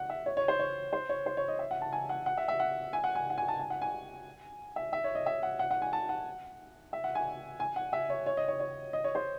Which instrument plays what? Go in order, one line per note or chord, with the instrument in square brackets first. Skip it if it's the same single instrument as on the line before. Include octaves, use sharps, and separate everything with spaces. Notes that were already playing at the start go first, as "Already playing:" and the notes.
Already playing: [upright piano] F#5
E5
C#5
C#5
C5
C#5
C5
C#5
C5
C#5
D#5
E5
F#5
A5
G#5
F#5
F#5
E5
E5
F#5
G#5
F#5
G#5
F#5
G#5
A5
G#5
F#5
G#5
E5
E5
C#5
D#5
E5
F#5
F#5
F#5
G#5
A5
F#5
E5
F#5
G#5
G#5
F#5
E5
C#5
C#5
D#5
C#5
C#5
D#5
C#5
C5